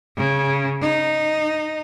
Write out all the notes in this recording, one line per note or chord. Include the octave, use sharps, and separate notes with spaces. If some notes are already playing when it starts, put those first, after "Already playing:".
C#3
D#4